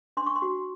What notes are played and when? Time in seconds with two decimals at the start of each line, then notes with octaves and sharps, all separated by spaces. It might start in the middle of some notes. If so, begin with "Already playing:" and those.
0.17 D4 C6
0.26 C#6
0.36 C6
0.42 F#4